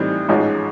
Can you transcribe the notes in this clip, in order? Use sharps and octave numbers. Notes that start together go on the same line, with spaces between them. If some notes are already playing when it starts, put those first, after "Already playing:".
Already playing: A2 E3 G3 C4 D#4
A1 G#2 F3 G#3 C#4